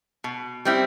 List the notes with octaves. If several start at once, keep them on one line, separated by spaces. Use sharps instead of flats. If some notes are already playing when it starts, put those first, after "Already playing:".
B2
G3 C4 E4